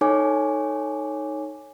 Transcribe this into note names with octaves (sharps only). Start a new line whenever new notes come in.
D#4 A4 C#5 G#5 D6